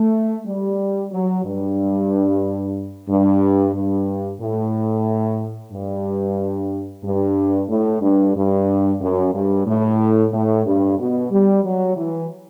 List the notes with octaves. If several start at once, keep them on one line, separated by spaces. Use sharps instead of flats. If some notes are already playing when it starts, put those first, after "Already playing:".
Already playing: A3
G3
F#3
G2
G2
G2
A2
G2
G2
A2
G2
G2
F#2
G2
A2
A2
G2
B2
G3
F#3
E3